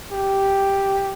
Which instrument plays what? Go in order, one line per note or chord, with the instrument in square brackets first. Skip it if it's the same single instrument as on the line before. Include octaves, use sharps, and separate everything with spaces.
[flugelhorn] G4